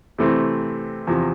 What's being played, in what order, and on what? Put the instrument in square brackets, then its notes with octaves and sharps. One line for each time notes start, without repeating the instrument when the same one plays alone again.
[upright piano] C3 E3 A3 C4
E2 C3 F3